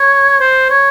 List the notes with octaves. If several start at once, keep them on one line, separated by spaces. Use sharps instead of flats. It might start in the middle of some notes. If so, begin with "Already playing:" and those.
Already playing: C#5
C5
C#5